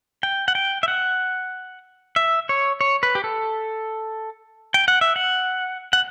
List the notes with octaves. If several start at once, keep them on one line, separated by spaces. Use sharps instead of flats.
G5
F#5
G5
E5
F#5
E5
C#5
C#5
B4
G4
A4
G5
F#5
E5
F#5
F#5